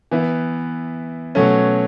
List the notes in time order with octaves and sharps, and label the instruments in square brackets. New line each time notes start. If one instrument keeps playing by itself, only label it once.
[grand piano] E3 B3 E4
B2 F#3 A3 C#4